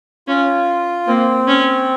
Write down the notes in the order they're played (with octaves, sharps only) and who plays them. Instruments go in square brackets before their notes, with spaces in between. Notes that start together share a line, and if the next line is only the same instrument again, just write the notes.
[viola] C#4 [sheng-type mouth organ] F4
[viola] A#3 [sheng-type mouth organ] C4
[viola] C#4